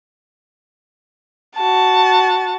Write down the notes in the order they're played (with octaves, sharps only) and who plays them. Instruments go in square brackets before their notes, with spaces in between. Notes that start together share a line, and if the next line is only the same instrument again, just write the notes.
[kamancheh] F#4 A5